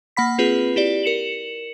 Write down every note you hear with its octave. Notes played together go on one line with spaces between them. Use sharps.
A#3 F#5 B5 B6
C4 F4 G#4 B4
E4 G4 D5
A#4 C#7 E7 F#7